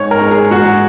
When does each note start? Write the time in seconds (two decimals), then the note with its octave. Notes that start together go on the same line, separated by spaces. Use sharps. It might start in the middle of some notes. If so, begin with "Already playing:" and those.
Already playing: G#2 G#3 D#4 C#5
0.11 A#4
0.21 G#3 D#4
0.31 G#4
0.51 G#2 F#4